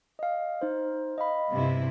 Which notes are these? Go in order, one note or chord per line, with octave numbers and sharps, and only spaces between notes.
D#5 F5
D#4 C5
D#5 F5 B5
G2 C3 E4